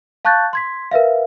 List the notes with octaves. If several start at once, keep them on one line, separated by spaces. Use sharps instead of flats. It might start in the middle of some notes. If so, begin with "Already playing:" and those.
F5 A5 C#6 F#6 G6 A6
C6 G#6 B6
A#4 B4 E5 F5